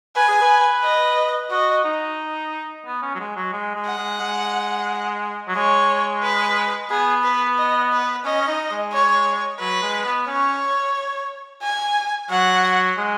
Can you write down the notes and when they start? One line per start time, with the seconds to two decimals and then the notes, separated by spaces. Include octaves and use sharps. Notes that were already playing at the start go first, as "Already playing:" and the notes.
0.16 B4 G#5
0.28 G#4
0.42 B4
0.83 D#5
1.50 F#4 D#5
1.84 D#4
2.86 B3
3.02 C#4
3.15 F#3
3.19 G#3
3.36 F#3
3.53 G#3
3.75 G#3
3.87 F#5
3.98 G#3
4.21 G#3
5.48 F#3
5.55 G#3 C#5
6.23 B4
6.90 B3 G#4
7.24 B4
7.58 D#5
7.92 B4
8.25 C#4 D#5
8.41 C#4
8.48 D#4
8.71 G#3
8.92 C#5
9.60 F#3 B4
9.82 G#3
10.05 B3
10.27 C#4 C#5
11.62 G#5
12.30 F#3 F#5
12.98 G#3